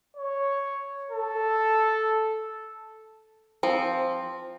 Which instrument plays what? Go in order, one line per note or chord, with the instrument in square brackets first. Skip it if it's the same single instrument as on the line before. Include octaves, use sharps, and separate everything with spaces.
[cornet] C#5
A4
[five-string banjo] F3 C4